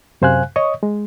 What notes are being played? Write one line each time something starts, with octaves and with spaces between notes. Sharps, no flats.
F#2 C3 C5 F5 G#5 F#6
C#5 D#5 C#6 D#6
G#3